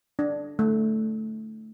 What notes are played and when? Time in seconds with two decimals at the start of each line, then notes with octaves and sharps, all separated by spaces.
0.19 D4
0.59 A3